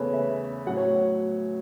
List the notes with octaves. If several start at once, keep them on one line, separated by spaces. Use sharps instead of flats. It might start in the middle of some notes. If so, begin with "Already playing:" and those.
Already playing: E2 C#3 A3 B4 C#5
E5
A2 F#3 F#5
C#5